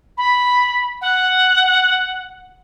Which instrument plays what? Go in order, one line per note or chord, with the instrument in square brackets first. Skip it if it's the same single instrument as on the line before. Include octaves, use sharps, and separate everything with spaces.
[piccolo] B5
F#5